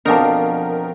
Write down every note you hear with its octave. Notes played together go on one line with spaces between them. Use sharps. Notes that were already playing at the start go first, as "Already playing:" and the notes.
F2 B2 F3 D4 D#4 A#4 A5